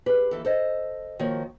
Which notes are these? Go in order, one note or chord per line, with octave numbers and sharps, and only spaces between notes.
G4 G#4 B4
D#2 E3 A4
A4 C5 D#5
D#3 F3 A#3 F#4 C#5